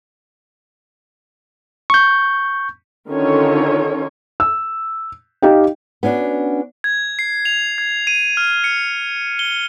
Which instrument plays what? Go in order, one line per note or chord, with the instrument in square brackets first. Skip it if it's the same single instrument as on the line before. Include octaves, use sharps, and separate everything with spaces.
[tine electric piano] C#6 G6
[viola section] D3 D#3 C#4 F4 A4 C#5
[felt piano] E6
D#4 G4 F5 G5
[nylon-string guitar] B3 C#4 D4 F#4
[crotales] G#6
C7
F7
G#6
D#7
F6
C#7
G7